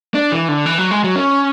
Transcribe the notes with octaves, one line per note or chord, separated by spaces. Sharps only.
D4
E3
D3
E3
F#3
G#3
F#3
C#4